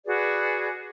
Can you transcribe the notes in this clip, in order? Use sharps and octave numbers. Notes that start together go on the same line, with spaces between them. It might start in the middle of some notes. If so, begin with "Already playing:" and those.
F#4 G#4 B4 D5